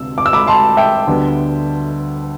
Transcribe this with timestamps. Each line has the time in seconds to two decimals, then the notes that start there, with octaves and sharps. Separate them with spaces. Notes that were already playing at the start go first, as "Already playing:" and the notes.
Already playing: D2 C3 E6
0.18 D6
0.26 E6
0.33 B5 D6
0.47 A5 C6
0.77 E5 G5
1.07 D2 D3 G3 B3